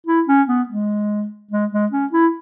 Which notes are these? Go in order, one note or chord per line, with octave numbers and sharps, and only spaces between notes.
E4
C#4
B3
G#3
G#3
G#3
C#4
E4